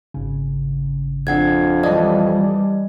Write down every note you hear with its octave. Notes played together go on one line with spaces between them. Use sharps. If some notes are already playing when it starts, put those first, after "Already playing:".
G#1 C#3
F2 D4 F#5 G#6
E3 G3 D5 D#5 A5